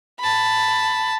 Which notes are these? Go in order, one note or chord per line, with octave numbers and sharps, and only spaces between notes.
A5 B5